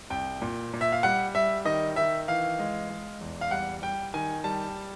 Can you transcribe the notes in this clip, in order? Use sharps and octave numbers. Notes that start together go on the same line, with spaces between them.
C2 G5
A#2
A#2
E5
F5
G3 F#5
G3 E5
D#3 D#5
D#3 E5
E3 F5
G#3
G#3
E2
F5
G3 F#5
G3 G5
D#3 G#5
G3 A5